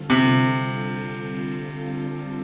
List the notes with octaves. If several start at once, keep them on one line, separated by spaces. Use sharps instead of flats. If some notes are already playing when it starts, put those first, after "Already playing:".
Already playing: D3 G3 C4 F4 A4
C3